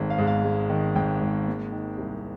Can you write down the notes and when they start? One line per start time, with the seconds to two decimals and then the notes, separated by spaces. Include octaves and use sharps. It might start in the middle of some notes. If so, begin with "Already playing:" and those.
Already playing: G#1 D#3 G#3
0.10 F5
0.18 G#2
0.27 F5
0.44 G#3
0.69 D#3
0.96 G#1 G5
1.21 G#2
1.47 A#3
1.72 D#3
1.98 C2